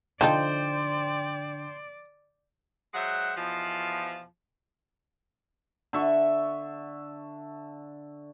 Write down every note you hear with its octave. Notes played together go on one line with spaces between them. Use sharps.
D3 F3 D#4 A4 C5 D5 G5
F#3 G#3 C5 E5 F#5
E2 B2 F3
D3 E5 C#6